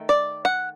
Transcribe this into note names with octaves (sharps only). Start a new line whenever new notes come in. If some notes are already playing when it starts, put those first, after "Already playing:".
Already playing: D#3 A3
D5
F#5